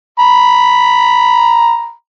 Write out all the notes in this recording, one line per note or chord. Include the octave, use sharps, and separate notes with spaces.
A#5 B5